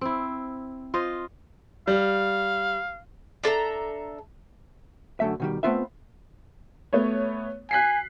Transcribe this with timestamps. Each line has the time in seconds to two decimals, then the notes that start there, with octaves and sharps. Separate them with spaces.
0.01 C4 E4
0.94 F4 C5 D#5
1.87 G3 F5
3.44 D4 A4 E5 A#5
5.20 F#2 D3 A3 E5
5.40 B2 D#3 G3
5.63 A3 B3 C4 F4 B4 E5
6.93 A3 B3 C#5
7.71 G#5 F#6 B6 C7